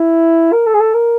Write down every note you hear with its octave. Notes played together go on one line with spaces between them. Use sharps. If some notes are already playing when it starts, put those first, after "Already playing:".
Already playing: E4
A#4
A4
G#4
A4
A#4